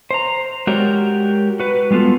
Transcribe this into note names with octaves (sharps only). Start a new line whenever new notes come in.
C5 A#5
G#3 F#4 G4 A#4 C#5 D5
F#4 B4
G3 G#3 B3 F4 A4